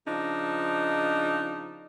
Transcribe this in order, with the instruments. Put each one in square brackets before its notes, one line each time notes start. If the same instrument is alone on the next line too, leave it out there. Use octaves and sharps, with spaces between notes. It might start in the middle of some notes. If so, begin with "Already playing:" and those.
[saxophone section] C#3 F3 D4 D#4